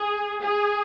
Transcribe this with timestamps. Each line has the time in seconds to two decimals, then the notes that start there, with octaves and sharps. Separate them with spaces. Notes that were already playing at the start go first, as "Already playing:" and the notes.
Already playing: G#4
0.39 G#4